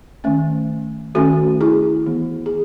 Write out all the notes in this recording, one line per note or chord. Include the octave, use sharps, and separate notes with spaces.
D#3 A3 C#4
D#3 A3 C#4 F#4 A4
E4 G#4
E3 B3
G#4